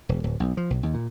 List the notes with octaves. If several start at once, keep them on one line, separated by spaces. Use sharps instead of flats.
E1
D1
B1
F3
B1
D#2
A#2